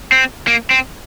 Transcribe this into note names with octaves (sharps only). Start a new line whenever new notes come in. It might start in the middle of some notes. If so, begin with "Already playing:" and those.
C4
A#3
C4